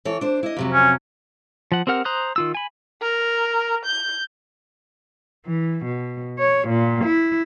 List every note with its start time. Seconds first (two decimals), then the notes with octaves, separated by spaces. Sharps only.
0.05 E3 A4 C#5
0.21 D4 C5
0.43 E4 D#5
0.57 F2 C3 F#3
0.73 C#4
1.72 F3 F#5
1.87 C4 G4 A#4 F#5 F6
2.05 C5 A#5 C6 D#6 F#6
2.36 D#3 F4 E6
2.55 G#5 B5
3.02 A#4
3.85 G6
5.45 E3
5.84 B2
6.38 C#5
6.68 A#2
7.03 E4